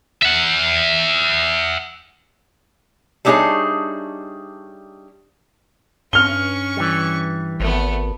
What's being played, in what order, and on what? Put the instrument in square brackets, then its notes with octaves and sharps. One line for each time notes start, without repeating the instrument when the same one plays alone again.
[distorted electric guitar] E5 F#5
[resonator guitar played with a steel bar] G3 A3 D4 D#4 G#4 C#5
[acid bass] G2 [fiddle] C#4 C#6 [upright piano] F6 G7
[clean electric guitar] E3 G3
[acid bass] G#1 [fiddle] A3 B3